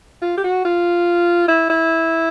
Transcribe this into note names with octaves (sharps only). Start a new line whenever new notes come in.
F4
G4
F#4
F4
E4
E4